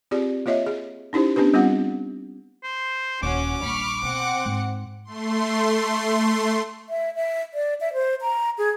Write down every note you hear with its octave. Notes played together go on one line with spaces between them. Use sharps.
C4 F4 G4 G#4 D5
A#3 F4 C#5 D#5 E5
G#4
C#4 D#4 E4 G4 C5
B3 C#4 D4 G4 B4
G3 B3 C4 F4 F#5
C5
D#1 C#4 F#4 C#5 D6
A#1 G3 B5 C#6 F6
B2 C4 F#5 C#7
G#2
A3 C6
E5
E5
D5
E5
C5
A#5
G#4